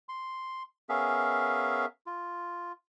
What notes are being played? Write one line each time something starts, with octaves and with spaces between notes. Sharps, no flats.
C6
B3 C#4 G#4 A#4 E5 F5
F4